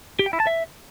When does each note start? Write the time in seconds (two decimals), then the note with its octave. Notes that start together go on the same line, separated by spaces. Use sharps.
0.19 G4
0.26 G5
0.33 E4
0.40 A5
0.47 E5